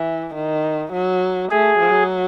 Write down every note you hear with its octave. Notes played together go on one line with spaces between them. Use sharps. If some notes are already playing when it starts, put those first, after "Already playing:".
Already playing: E3
D#3
F#3
A3 G#4
F#3